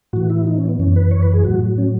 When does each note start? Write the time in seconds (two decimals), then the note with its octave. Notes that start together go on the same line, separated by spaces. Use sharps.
0.13 A2 E3 F#4
0.30 E4
0.47 D#4
0.58 C#4
0.69 B3
0.79 F#2 E3 C#4
0.96 B4
1.11 C#5
1.22 B4
1.34 G#4
1.44 A2 F#3 F#4
1.78 C#4